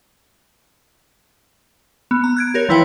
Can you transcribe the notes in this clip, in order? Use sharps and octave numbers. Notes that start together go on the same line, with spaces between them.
B3
A#5
F#6 G#6 D7
G4 A#4 C#5
E3 F3 E4 B4 C#5 G5